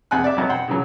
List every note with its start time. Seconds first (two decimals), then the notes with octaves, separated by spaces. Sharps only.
0.11 E2 C4 F#5 G#5 F#6
0.24 D5 E5
0.37 F2 B2 F#3
0.49 C5 F#5 G5
0.68 C#3 E3 F#3